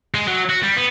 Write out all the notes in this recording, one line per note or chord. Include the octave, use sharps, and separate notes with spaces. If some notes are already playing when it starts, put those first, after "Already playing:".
G#3
F#3
F#4
G3
B3